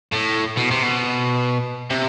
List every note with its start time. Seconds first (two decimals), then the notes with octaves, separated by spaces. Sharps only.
0.13 A2
0.57 B2
0.71 C3
0.82 B2
1.90 C3